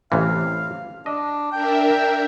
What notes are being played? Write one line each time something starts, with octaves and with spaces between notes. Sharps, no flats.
A1 C3 E3 F5
D4 D#5
D4 A#4 E5 G5